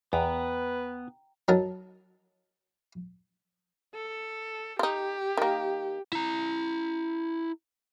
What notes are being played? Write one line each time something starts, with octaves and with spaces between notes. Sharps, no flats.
E2 B3 B4 G5 A#5
F#3 D#4 A#4 A5
A4
D#4 F4 G4
D#3 A#3
E4 A#5